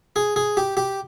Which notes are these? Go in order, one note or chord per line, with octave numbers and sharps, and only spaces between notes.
G#4
G#4
G4
G4